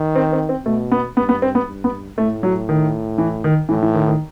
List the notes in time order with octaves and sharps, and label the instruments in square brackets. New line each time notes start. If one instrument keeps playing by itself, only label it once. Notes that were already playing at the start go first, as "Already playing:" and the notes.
Already playing: [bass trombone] D#3
[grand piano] C4
C4
C4
[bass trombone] B2 [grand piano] A3
[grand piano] B3
[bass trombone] G2 [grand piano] B3
[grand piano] B3
C4
B3
[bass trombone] G2
[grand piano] B3
[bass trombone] A2 [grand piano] A3
[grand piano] F#3
D#3
E3
D#3
[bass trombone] A2 [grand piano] E3
[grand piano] E3
D#3
D#3